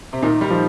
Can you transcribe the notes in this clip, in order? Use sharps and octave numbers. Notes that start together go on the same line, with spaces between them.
C3
A#2 D#3 D#4
D#3 G3
F3